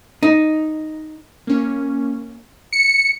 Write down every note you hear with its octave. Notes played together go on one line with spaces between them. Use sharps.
D#4
A#3 C#4
C#7